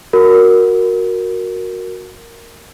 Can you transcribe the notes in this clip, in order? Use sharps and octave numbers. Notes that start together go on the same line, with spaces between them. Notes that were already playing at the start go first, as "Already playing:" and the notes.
F#4 A#4